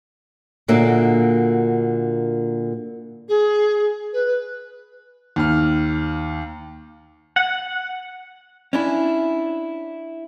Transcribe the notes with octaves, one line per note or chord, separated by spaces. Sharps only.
A#2 D3 A#3 F#4 E5
G#4
B4
D#2 F6
F#5
C#4 D4 E4